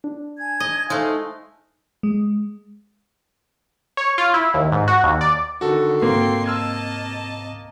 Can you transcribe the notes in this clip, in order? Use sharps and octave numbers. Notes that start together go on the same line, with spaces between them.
D4
G#5 A5 G#6
D#5
G#3 A3 D#4 F4 C5 F5
G#3
C#5
F4
E4
D#2
G#2
F#4
D#2
D5
D3 D#3 F#4 A4
G#2 C3 A#3 C4 G5 C6
D#5 A5 E6 F6 G#6